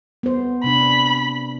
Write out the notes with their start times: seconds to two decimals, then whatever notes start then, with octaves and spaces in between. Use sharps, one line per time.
0.23 B3 C5
0.64 C3 D4 B5